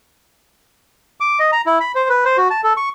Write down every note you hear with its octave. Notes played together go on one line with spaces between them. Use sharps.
D6
D#5
A#5
E4
B5
C5
B4
C5
F#4
A5
A4
C#6